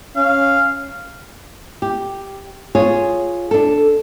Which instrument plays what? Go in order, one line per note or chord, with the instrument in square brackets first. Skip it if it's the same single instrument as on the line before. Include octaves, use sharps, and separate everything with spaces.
[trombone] C#4 [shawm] F5
[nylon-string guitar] G4
F4 G#4 C#5
D4 A4